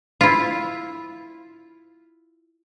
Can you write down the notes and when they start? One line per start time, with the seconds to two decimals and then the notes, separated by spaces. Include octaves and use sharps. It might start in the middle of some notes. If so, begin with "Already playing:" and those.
0.21 E4 F4